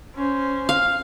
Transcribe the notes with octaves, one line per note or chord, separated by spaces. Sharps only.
C#4 C5
F5